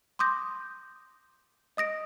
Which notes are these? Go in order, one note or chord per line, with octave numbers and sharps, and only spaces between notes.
C6 D6 D#6 G6 A#6
D#5 D#6 A#6 D7